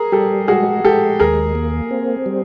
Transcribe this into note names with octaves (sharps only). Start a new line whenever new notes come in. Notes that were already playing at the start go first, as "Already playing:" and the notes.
Already playing: G#4 A#4
G3 G4 A4
G#3 F#4 G#4
G#3 G4 A4
D#2 G#4 A#4
A#3
C4
G3